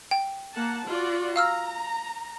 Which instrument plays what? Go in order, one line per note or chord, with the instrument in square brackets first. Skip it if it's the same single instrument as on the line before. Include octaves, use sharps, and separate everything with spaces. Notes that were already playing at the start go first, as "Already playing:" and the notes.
[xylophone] G5
[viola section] A#3 F#5 A5
F4 F#4 D5
[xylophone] F5 E6 F6 [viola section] A#5